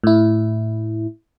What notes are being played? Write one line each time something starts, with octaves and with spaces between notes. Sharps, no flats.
A2 E4